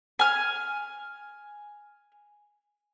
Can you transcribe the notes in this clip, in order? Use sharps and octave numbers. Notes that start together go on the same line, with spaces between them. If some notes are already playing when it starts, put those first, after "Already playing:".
G#5 F6